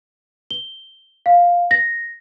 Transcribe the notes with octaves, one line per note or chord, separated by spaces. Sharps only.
G7
F5
A#6